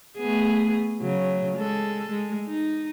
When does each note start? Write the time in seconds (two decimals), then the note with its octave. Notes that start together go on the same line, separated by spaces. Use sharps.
0.18 A3 B3 G#4
1.01 C#3 F#3
1.58 G#3 A4
2.11 G#3
2.48 D#4